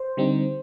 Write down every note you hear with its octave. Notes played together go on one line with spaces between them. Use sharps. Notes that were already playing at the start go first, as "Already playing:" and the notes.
Already playing: C5
D3 G3 C4 D#4